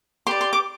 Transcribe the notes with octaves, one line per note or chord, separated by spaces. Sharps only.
G4 B4 D5 C6
C6
D6